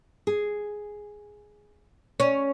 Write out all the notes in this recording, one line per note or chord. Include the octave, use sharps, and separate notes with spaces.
G#4
C#4